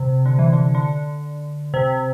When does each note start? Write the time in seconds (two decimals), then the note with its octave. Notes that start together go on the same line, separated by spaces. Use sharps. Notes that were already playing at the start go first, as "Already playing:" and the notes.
Already playing: C3
0.25 D3
0.39 E3
0.53 D3
0.75 D3
1.74 C3